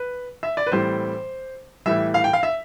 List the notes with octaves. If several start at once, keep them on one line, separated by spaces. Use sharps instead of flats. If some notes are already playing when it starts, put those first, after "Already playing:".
Already playing: B4
E5
D5
B4
A2 E3 G3 C4 C5
A2 E3 G3 E5
F5
G5
F5
E5